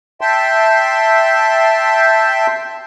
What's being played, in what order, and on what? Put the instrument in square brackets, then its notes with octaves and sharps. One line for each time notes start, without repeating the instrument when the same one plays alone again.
[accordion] E5 G5 A5 C6